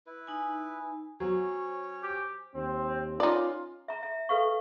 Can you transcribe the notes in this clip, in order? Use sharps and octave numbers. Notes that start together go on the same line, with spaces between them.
E4 B4
D#4 G#5
F#3 C#4 C5 C#5
G4
D#2 C4
C#4 D#4 F4 D5
E5 A#5
E5
A4 B4 F5 C#6